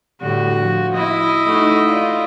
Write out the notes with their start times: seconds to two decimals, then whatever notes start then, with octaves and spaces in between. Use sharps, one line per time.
0.20 A2 D3 G3 F#4
0.59 F3
0.94 E4 D#5
1.46 A3 D#4 F#4
1.86 F4 D5